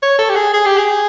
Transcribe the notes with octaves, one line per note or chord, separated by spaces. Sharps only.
C#5
A4
G4
G#4
G#4
G4
G#4